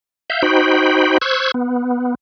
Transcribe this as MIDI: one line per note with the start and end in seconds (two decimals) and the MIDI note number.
0.30 0.42 76
0.30 0.42 77
0.30 0.42 91
0.43 1.18 63
0.43 1.18 66
0.43 1.18 72
0.43 1.18 79
0.43 1.18 83
1.21 1.51 72
1.21 1.51 85
1.21 1.51 88
1.21 1.51 90
1.21 1.51 92
1.54 2.15 59